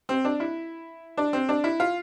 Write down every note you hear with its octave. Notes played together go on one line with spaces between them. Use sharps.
C4
D4
E4
D4
C4
D4
E4
F4